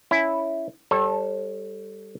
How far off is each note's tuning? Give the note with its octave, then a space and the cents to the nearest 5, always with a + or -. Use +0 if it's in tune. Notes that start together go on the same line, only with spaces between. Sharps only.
C#4 +5 E4 +0
G3 +5 A4 +0 C#5 -40